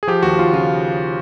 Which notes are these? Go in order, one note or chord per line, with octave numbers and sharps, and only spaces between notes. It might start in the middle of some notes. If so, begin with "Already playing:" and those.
G#4
F3 G4
D#2 F#4
D#2 F4
C#3 F4